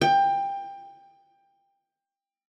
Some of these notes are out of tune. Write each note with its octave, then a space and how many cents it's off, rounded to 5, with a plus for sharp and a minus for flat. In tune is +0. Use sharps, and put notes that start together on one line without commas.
G5 +20